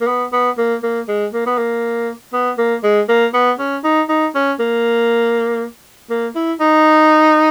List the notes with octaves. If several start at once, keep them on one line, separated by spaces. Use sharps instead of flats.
A#3
B3
B3
A#3
A#3
G#3
A#3
B3
A#3
B3
A#3
G#3
A#3
B3
C#4
D#4
D#4
C#4
A#3
A#3
E4
D#4